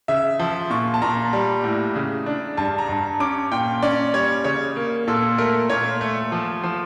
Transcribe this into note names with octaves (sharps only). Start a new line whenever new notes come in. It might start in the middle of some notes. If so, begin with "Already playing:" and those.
C#3 E5
F3
A#2 C#6
A5
A#2 A#5
G3
A2
C#3
D4
G2 A5
A#5
G2
C#4 D6
A#2 G5
C#4 D5
G3 C#5
C#3 C#5
A#3
A#2 A4
A3 A#4
A#2 C#5
A3
F3
F3